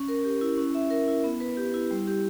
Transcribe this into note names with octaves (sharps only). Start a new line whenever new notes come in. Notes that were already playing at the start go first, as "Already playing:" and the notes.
Already playing: C#4
A#4
G4
E4
C#4
E5
A#4
E4
B3
B4
G4
E4
G3
G4